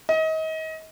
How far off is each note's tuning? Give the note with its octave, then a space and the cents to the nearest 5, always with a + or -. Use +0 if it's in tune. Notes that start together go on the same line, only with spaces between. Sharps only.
D#5 +35